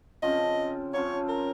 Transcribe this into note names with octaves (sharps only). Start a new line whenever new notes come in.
C#3 F3 C4 D#5
C#3 F3 C4 C#5
A#4